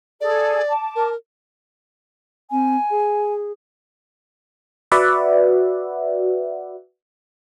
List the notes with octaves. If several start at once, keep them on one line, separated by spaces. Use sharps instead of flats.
G#4 A4 D5
A5 D6
A#4
C4 G#5
G#4
F#4 B4 D5 E5 F#5